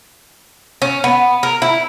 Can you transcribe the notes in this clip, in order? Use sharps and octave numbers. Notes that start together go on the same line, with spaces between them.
C#4
B3
A#4
E4